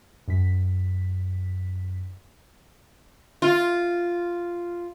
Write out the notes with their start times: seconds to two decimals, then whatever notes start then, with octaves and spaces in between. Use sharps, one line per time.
0.28 F#2 B6
3.42 F4